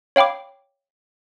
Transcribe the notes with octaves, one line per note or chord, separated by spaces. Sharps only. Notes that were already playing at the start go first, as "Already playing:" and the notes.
C#5 F5 G5 B5 D6